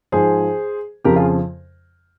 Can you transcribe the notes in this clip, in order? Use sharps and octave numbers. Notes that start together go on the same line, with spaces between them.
G#2 F3 G#4 C5
F2 C#3 F3 G4 A#4
F4 G#4